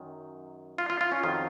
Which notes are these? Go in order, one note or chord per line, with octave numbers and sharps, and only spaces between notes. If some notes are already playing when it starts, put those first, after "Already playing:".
Already playing: F#2 D#3 F#3
F4
F4
F4
C#4
F2 D#3 F#3 F4